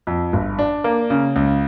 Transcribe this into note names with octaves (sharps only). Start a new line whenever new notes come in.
F2
G1
D4
A#3
C#3
C#2